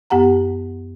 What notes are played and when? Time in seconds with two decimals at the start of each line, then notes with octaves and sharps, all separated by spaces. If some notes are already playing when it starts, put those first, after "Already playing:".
0.10 F#2 B3 G4 F#5 A#5